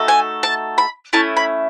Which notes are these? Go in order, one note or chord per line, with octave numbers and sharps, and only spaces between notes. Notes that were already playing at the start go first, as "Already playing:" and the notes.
Already playing: A3 D#4 F#4 A4
G#5
A5
B5
A3 C#4 E4 A5
B5